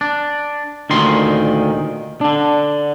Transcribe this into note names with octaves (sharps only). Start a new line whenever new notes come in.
D4
D2 A#2 D#3 C6
D3 D4